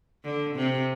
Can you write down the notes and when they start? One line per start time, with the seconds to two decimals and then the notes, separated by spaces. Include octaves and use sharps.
0.24 D3
0.55 C3